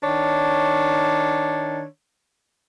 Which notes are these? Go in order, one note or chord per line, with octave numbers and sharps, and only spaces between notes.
D#3 D4 C#5